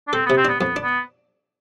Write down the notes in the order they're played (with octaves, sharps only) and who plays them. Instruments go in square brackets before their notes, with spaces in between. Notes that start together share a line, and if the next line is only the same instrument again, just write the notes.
[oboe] D4
[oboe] C4 [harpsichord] A4
[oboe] B3
[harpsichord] C3
[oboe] C4
[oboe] B3 [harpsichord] D4
[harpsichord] F2 [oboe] B3
[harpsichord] D4
[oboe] B3